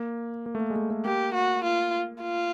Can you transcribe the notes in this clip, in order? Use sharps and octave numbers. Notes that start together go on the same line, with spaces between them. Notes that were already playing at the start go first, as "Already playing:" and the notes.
Already playing: A#3
A#3
A3
A#3
G#3
A3
A3
A#3 G4
F#4
F4
F4